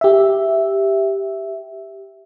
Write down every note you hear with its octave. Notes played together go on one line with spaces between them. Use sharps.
G4 E5